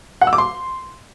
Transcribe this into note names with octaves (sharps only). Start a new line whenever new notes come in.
F#5
E6
D6
C6